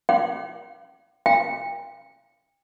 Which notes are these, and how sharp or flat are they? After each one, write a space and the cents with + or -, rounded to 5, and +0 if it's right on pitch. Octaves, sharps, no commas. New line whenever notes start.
G5 -45
G5 +40